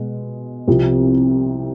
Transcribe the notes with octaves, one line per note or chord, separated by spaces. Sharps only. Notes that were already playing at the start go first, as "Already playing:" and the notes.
Already playing: B2 G#3
C2 C3 F3